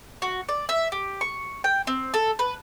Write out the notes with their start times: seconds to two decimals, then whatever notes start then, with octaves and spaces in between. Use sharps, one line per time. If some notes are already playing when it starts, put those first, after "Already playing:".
0.22 F#4
0.49 D5
0.69 E5
0.92 G4
1.21 C#6
1.64 G5
1.87 C4
2.14 A4
2.39 B4